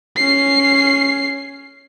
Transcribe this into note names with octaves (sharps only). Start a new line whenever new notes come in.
C#4 C7